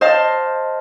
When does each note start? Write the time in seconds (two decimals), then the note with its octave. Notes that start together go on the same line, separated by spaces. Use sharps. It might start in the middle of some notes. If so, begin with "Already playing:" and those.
0.01 C5 D#5 F5 A5